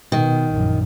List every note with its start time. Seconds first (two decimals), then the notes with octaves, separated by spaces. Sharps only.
0.12 B2 D#3
0.51 A#1 F#2